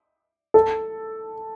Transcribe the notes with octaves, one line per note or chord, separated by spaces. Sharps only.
A4